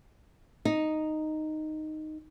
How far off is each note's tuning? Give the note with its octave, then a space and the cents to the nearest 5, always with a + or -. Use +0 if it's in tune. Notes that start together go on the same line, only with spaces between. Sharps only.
D#4 -5